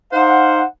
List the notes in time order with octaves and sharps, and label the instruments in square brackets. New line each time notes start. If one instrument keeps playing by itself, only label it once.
[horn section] D#4 C5 F5 F#5